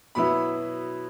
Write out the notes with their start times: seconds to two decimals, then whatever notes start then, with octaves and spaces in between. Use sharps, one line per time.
0.15 B2 F#3 B3 E4 B5